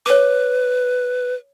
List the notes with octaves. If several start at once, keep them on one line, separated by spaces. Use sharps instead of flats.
B4 C#5 D6